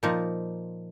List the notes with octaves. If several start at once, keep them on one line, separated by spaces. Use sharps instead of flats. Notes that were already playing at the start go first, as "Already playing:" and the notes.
A#2 F3 A#3 D#4